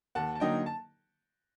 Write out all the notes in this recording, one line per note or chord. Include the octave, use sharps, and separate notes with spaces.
D#2 F#5 A5
A5
D3 F#3 A#3 D#4 D#5 G5
A5